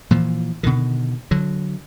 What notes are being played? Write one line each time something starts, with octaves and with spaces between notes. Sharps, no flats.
A#2 E3 F3
B2 D3 D#3
D3 F#3